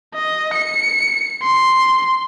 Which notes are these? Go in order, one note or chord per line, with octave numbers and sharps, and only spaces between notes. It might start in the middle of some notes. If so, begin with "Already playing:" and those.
D#5
C#7
C6